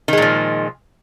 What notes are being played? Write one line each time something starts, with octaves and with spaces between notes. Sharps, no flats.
A#2 D#3 F3 G#3